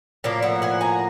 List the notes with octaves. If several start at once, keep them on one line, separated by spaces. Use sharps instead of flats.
A2 F3 A#3 D5
E5 F#5
F#5 G#5
G#5 A#5